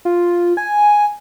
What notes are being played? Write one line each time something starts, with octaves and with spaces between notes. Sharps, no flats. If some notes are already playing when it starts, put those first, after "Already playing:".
F4
G#5